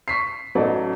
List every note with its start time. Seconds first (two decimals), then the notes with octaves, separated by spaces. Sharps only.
0.08 C#6 B6 C7
0.55 A1 F#3 D#4 A4 D5